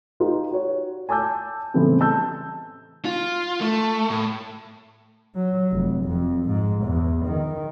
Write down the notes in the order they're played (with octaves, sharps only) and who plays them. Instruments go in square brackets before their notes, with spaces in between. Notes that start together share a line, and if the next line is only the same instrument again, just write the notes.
[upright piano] D#4 F4 G4 B4
F#4 C#5
G#5 A5 D6 E6 G6
A2 C#3 E3 G3 B3 C4
A5 E6 G6
[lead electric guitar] F4
A3
A2
[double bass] F#3
F1
F2
G#2
E2
D#3